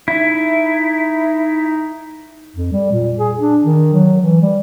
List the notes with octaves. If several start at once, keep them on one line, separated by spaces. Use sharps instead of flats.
D#4 E4
F2
G3
A#2
G#4
D4
D#3
F#3
E3
G3